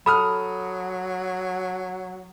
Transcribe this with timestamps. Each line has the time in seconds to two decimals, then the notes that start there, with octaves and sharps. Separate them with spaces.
0.06 F#3 A4 B5 D#6 F6